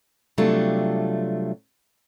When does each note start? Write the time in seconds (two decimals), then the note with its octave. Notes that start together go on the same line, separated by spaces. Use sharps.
0.38 C3 F#3 G3 A3 D4 F4